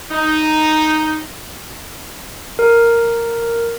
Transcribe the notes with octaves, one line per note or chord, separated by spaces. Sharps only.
D#4
A#4